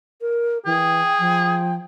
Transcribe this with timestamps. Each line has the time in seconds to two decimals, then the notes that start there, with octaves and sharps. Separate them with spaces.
0.21 A#4
0.66 E3 G#4 G5
1.19 F3